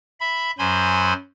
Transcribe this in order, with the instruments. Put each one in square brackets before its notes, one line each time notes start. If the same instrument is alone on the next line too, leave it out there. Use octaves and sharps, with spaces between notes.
[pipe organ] E5 B5
F#2 F#3 C5 G#5 B5 C6